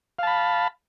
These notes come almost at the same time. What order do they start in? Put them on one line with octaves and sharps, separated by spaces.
F5 A5 B5